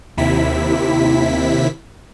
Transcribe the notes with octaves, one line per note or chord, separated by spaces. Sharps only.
D#2 C3 E4 B6